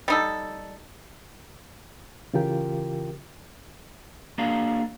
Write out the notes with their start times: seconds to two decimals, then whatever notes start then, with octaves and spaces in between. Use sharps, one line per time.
0.08 G3 D#4 A4
2.34 C#3 E3 F4 G4 A#4 G5
4.38 A#3 D4 F#4 G#4 D5 F5